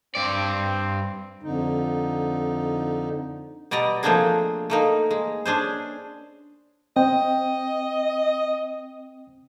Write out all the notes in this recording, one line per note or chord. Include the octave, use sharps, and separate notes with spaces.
G2 C4 D5
F2 D3 D#4
B2 G3 D5 D#5 A#5
F3 A3 A#3 C4 D4 G#4
A3 A#3 D#4
G#3
C#4 D4 G#4 C5
C4 D#5 G5